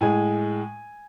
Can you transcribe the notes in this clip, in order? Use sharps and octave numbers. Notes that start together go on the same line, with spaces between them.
A2 G#3 G#5